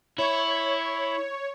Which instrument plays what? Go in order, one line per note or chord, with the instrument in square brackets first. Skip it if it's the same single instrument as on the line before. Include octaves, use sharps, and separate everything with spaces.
[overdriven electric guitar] E4 [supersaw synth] C#5